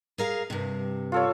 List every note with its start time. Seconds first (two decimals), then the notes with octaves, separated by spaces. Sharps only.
0.18 G#4 A#4 F5
0.50 G2 C3
1.12 F4 A4 C#5